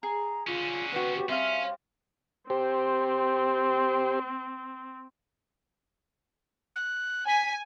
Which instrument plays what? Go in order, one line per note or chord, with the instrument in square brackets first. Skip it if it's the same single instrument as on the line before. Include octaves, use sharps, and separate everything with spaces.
[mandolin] G#4 [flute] A#5
[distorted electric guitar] D3 C#4 [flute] F4
[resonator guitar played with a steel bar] B3 C4 F#4 [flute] B4
[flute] G4
[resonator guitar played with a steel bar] G3 [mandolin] C4 F5 [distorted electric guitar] C#4 [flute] E5
[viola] C4 [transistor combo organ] G4 C5
[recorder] F#6
[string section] G#5 [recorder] B6